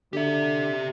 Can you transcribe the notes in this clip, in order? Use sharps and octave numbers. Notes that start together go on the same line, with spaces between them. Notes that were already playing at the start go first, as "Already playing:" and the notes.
D3 G4 E5